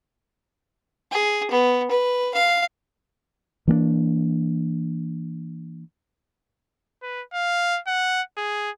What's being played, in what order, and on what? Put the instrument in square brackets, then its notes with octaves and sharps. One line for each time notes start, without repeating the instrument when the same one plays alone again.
[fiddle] G#4
B3
B4
F5
[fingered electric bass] E3 A#3 B3 D4
[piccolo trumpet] B4
F5
F#5
G#4